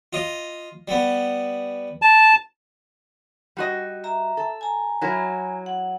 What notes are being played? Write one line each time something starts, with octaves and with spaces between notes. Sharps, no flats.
F4 D#5
G3 B3
A5
G3 F#4 D#5
E5 A#5
A4
G#5 A#5
F#3 E4 A#4
F#5